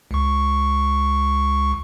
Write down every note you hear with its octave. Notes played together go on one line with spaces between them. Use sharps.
C#2 C#6